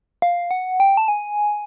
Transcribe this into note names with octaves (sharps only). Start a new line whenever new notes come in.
F5
F#5
G5
A5
G#5